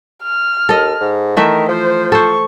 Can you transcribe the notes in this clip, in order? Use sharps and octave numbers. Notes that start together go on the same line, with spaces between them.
F6
D#2 A4 D#5
G#2
D#3 E3 A3 A#4 E5
F3 C5
A4 C5 C#6